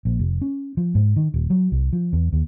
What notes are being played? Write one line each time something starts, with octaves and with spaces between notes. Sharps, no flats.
A#1
F1
C#4
F3
G#2
D#3
D#1
F#3
C2
F3
E2
D#2